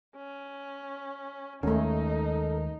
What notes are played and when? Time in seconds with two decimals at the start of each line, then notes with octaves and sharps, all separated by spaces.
0.16 C#4
1.63 D#2 G#3 A3 C#4 D#4 A4 A#4